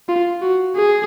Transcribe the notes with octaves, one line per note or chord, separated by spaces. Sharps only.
F4
F#4
G#4